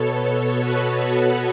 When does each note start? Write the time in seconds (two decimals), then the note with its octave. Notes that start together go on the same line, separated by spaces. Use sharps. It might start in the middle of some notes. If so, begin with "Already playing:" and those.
Already playing: B2 B3 A4 C#5
0.60 F#4 B4